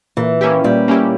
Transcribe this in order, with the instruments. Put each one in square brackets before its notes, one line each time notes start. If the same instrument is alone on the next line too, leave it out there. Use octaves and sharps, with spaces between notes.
[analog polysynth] A#2 [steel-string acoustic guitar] E3
[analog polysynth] A#3 C#4 E4 G4
[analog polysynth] A#2 [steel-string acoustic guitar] G3
[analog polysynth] A#3 C#4 E4 G4